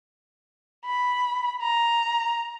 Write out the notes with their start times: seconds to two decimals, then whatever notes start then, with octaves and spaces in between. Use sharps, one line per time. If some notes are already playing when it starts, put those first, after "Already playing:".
0.86 B5
1.62 A#5